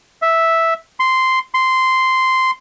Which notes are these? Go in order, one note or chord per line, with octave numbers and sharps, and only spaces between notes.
E5
C6
C6